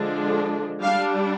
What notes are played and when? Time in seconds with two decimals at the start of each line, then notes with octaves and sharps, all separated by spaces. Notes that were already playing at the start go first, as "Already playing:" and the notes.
Already playing: D3 F3 G#3 D4
0.82 G3 D4 F5